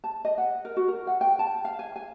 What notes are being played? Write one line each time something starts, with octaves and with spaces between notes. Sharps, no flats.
A5
D#5
F#5
A#4
F#4
A#4
F#5
G5
A5
F5
G#5
G#5